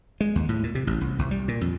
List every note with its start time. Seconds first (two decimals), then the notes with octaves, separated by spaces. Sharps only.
0.21 G#3
0.36 D#2
0.49 A2
0.63 A#2
0.75 C3
0.87 A1
1.01 C2
1.19 C2
1.31 G3
1.48 A#2
1.61 F2